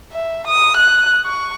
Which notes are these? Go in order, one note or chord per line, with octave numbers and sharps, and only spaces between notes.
E5
D#6
F#6
C#6